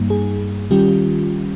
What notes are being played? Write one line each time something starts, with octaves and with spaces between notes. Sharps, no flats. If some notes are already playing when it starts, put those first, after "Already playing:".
Already playing: G2 G3 A#3 D#4
G#4
D#3 G3 C#4 F4 G4